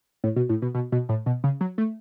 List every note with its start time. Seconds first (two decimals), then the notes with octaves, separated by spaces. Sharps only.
0.24 A2
0.36 B2
0.49 A2
0.62 B2
0.75 B2
0.92 B2
1.09 A2
1.26 B2
1.44 C#3
1.61 F#3
1.78 A3